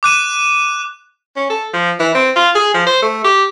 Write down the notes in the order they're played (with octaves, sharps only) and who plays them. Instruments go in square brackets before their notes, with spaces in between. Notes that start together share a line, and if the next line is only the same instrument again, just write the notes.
[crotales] D6 F#6 D#7 E7
[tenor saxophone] C#4
A4
F3
E3
C4
F4
G#4
F3
C5
A3
G4